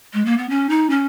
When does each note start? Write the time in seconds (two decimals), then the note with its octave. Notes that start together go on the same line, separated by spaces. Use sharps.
0.14 G#3
0.25 A#3
0.38 B3
0.49 C#4
0.70 D#4
0.90 C#4